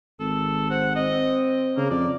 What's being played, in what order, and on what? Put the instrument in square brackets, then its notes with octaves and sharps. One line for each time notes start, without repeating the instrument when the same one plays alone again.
[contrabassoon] G#1 [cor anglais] A4
[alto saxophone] C5 [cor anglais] F#5
[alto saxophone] C4 [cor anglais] D#5
[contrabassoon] C#3 [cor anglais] A#3
[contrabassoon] F2 [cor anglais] D5